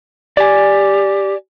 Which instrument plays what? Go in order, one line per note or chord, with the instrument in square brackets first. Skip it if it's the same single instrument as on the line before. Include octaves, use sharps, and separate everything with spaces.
[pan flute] G4 [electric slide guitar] D5 G#5